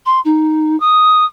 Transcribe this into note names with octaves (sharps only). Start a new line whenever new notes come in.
C6
D#4
D#6